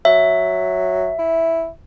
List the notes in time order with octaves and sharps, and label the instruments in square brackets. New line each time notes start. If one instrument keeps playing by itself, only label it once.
[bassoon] F#3 [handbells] E5
[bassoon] E4